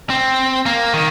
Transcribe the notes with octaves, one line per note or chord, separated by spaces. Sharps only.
C4
A#3
D#3